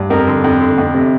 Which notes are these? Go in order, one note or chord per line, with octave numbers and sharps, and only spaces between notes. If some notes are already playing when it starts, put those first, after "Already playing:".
Already playing: G2
F2 A#4
D3
F2
D3
F2
C3